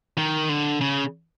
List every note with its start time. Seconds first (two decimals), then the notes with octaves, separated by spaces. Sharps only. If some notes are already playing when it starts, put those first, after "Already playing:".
0.18 D#3
0.49 D3
0.81 C#3